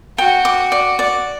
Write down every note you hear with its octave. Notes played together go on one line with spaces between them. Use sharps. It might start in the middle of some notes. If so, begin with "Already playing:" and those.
F#4 G5
D6
D5
D5